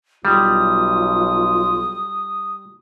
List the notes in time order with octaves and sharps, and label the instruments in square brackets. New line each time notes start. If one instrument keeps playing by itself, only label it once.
[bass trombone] B1 [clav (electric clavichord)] G3 [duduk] F4 [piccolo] D#6